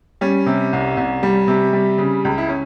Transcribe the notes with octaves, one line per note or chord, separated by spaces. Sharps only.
G3 C#4
C3
C2
C2
G3
C3
G3
C#3
C#2
E4
C#4